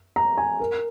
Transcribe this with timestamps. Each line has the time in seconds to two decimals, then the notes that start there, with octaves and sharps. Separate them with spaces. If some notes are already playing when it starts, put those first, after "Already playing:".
0.16 A#5
0.38 G#5
0.60 A#4